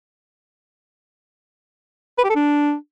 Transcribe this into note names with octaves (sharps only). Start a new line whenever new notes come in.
B4
G4
A4
D4